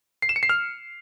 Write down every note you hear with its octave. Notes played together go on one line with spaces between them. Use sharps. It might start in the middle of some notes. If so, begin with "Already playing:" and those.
C7
E7
C#7
C7
F6